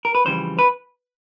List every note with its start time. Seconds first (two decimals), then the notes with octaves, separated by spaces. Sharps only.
0.05 A#4
0.15 B4
0.25 F2 C#3 E3 G3 C5
0.59 B4